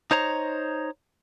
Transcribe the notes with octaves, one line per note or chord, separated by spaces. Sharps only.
D#4 C5 C#5 A#5